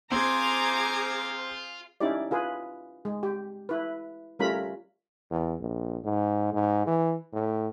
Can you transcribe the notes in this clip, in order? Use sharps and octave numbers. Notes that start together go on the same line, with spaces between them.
C4 F4 G#4 C5 A#5 D6 G#6
C#4 D#4 E4 G4 D5
F4 G#4 B4
G#3
G4
E4 B4
G3 A3 C#4 F4 A#4 B5
E2
A#1
G#2
G#2
E3
A2